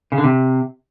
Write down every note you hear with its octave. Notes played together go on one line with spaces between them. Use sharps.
C#3
D3
C3